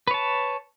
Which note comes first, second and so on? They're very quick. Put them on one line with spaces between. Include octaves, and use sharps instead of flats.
B4 C#5 A5